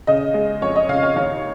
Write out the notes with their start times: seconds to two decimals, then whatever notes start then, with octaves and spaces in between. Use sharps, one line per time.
0.07 C#3 D#5
0.34 G#3
0.61 F2 C#5
0.76 D#5
0.89 C#3 F5
1.03 C#5
1.16 D#2 C#5